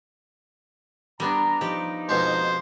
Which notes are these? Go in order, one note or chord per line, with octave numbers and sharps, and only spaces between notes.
G3 B3 D4 A#5
F3 D#4 G4
F2 B2 G#3 C5